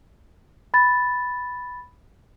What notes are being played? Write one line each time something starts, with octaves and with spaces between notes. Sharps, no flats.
B5 A6